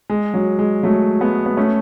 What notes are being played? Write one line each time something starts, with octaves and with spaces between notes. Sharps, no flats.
G#3
F#3
G#3
F#3 A3
G#3 B3
B3
A3 C#4